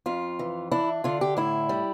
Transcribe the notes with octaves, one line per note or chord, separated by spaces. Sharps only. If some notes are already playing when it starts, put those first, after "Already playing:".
F2 F4
E3
D4 E4
D3 F4
G4
A2 E4
G3